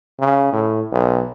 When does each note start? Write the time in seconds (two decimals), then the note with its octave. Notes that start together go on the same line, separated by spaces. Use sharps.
0.20 C#3
0.53 A2
0.92 B1